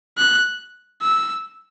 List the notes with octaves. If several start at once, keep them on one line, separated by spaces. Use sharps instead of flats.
F#6
E6